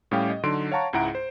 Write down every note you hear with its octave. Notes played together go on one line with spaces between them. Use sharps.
A2 G3 C#4 G4 F5 G5
D#5
D3 F#3 D#4 C6 D7
C#5 F5 F#5 A5 A#5 C#6
C#2 G#2 E4 F#5 A#5 D7
C5